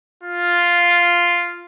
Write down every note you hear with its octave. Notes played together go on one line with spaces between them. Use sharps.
F4